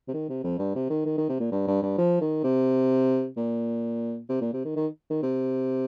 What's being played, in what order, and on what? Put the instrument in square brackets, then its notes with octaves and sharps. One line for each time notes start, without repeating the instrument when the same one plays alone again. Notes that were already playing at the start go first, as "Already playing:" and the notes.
[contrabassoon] C3
D#3
C3
F2
G2
C3
D#3
D#3
D#3
C3
A#2
G2
G2
G2
F3
D#3
C3
A#2
C3
A#2
C3
D#3
D#3
D#3
C3